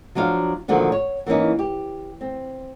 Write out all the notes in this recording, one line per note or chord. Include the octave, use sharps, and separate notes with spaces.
F3 F#3 D4 F5
A#2 D3 D#3 F3 F#3
C#5
E3 A#3 C4 C#4 D#4
G4
C4